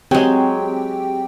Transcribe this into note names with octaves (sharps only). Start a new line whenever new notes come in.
F#3 G#3 C4 G4 G5